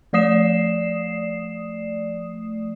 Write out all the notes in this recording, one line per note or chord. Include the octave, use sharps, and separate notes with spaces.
F3 A3 D5 D#6 C7 E7